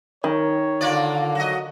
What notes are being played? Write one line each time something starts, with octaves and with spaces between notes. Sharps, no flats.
D#3 C#5
D3 A#3 F4 D5
F#3 F#4 D#5